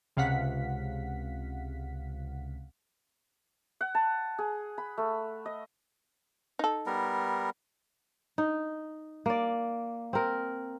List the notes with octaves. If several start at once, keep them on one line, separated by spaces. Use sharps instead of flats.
C#2 C3 F5 F#5 B6
F#5
A5
G#4
B5
A3
D#5
D#4 A4
G3 B3 A#4
D#4
A#3 D5
C4 A#4